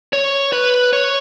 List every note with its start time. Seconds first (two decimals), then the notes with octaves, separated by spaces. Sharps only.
0.13 C#5
0.53 B4
0.93 C#5